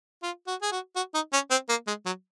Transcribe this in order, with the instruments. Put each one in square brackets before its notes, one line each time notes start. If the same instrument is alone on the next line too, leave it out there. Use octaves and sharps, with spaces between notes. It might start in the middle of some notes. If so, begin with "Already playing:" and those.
[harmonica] F4
F#4
G#4
F#4
F#4
D#4
C#4
C4
A#3
G#3
F#3